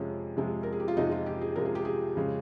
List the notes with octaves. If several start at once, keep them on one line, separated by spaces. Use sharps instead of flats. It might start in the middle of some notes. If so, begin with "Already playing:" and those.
Already playing: F2 C3 F3 G#3 C#4
F2 C3 F3 G#3
A#4
G#4
G4
F4
F2 C3 F3 G#3 D#4
F4
G4
G#4
F2 C3 F3 G#3 A#4
G#4
G4
G#4
F2 C#3 G#3